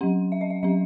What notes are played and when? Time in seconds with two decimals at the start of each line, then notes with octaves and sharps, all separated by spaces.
0.01 F#3 C#4 F#5
0.32 E5
0.41 D#5
0.50 E5
0.63 F#3 C#4 E5